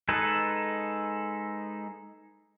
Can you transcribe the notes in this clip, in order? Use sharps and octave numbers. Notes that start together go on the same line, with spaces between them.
G#3 D#4 A4 B4